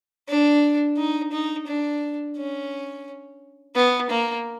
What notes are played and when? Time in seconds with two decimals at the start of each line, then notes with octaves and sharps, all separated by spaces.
0.28 D4
0.97 D#4
1.32 D#4
1.67 D4
2.37 C#4
3.76 B3
4.10 A#3